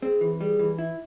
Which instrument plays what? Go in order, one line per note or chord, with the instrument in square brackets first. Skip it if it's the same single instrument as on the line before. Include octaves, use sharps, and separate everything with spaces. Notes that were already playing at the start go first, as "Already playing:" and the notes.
[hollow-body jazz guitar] C4 [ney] G#4
[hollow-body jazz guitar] E3
[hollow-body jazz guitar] G3 [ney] G#4
[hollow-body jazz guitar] E3
E4